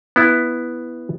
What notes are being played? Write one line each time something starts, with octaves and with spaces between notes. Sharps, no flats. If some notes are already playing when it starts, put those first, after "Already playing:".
B3 E4